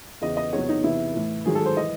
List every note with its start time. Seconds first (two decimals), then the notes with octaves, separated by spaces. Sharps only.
0.21 E2 C#3 E3 D#5
0.37 D#5
0.53 E2 C3 F#3 C#5
0.69 D#4
0.84 E2 C3 E3 E4
1.14 A2 E3
1.45 G#2 D#3 F#3 G#4
1.55 A4
1.65 C5
1.77 E3 D#5